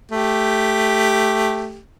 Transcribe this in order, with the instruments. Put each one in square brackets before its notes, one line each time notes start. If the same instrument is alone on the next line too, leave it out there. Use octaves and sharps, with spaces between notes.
[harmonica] A3 G4